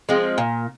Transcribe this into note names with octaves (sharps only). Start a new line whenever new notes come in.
F3 G#3 C4
A#2